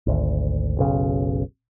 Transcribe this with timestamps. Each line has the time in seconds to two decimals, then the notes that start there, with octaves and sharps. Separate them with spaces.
0.07 G#1 D2
0.77 F#1 B1 C#3